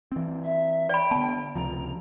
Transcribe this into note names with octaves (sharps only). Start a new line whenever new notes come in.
E3 C4
E5
D5 G5 B5
D3 B3 A5
C#2 C3 F3 A#5